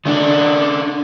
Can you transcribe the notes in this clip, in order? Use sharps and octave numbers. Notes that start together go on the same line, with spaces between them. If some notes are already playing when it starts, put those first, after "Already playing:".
D#3 D4